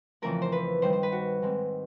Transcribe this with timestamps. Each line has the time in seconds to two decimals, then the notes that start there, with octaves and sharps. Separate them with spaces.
0.22 F2 C#3 E3 A3 C4 A#4
0.42 C5
0.52 B4
0.82 G2 D#3 G3 C5
0.93 C5
1.03 B4
1.12 F#4
1.42 G#2 D#3 G#3 C4